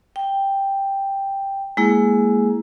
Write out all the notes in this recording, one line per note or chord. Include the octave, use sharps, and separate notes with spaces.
G5
G#3 A#3 E4 G#4